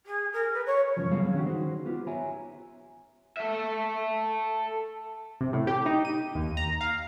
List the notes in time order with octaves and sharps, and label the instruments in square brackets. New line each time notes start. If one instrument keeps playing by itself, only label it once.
[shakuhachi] G#4
A#4
B4
C#5
[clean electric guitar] F#2 C#3 F3
F#3 G3 B3 G#4 C#5 F5
D3 D#3 C#4 D4 F#4 G4
D#4 F#4 C5
B3 F4 G4
C#5 E5 G#5 A#5
[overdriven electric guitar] A4 E5
[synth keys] C3
A2
G4
D#4
D#7
D#2
A#5
F5